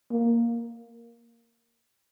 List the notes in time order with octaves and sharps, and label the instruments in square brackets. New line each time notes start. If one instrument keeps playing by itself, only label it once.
[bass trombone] A#3